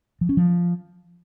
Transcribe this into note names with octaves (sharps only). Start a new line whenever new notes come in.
F3
C#4
F3